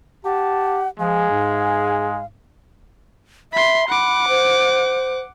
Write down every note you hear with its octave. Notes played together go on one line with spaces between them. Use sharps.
G4 F#5 A5
F3 G#3 G#4 F5
G#2
E5 B5 C6
F#5 B5 D6
C5